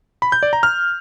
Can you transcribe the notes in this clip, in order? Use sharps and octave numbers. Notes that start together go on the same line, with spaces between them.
B5
G6
D5
A#5
F6